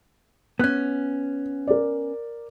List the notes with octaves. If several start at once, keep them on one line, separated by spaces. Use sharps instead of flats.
B3 C#4 F#6
A#4 D5